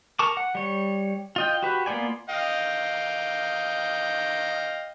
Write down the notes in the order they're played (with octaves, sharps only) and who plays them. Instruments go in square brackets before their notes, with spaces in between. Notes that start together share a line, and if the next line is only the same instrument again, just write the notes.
[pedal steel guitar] A#4 A5 C#6 D6
F#5
G3 C#5
F4 D#5 G5
F#4 G4 B4
A#3 B3 F4 D5 G#5
[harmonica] D#5 F5 G5